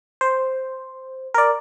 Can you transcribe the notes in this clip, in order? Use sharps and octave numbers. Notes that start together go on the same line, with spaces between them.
C5
A#4 D5